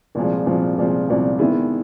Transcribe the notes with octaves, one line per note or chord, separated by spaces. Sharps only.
C2 A#2 F3 G#3
C2 A#2 F3 G#3
C2 A#2 F3 G#3
C2 A#2 F3 G#3
D#3 G#3 B3 E4 G#4